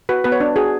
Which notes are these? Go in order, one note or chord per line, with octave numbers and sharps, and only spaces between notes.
F#4 B4
B3 B4
C#5
D4
F#4 G#4